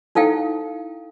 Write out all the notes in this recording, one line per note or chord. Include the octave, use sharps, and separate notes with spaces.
D#4 E4 A4 F5 G5